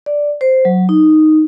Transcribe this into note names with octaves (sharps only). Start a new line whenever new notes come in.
D5
C5
F#3
D#4